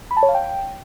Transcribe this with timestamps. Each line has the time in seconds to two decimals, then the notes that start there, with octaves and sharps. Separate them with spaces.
0.11 B5
0.17 A5
0.23 C#5
0.29 F5
0.35 G5